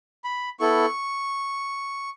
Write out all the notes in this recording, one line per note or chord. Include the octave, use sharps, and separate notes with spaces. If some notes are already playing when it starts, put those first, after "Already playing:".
B5
B3 E4 A4 C#6